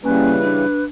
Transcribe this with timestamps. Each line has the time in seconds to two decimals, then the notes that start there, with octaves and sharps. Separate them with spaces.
0.04 C#3 E3 G3 A#3 C#4 B4 G#5
0.43 D4